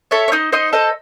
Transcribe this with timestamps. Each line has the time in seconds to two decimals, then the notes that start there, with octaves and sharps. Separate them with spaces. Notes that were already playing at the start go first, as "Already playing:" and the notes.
0.11 A4 C#5 E5
0.28 C#5
0.32 D#4 C5 D#5
0.52 D#4 C5 D#5
0.73 A4 C5 D#5